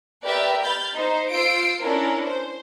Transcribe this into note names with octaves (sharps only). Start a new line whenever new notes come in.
G4 A#4 B4 D5 E5 G5
B5 F6 G6 A6
D#4 C5
F4 C5 E6 C7 D7
C#4 D4 E4 A#4
C5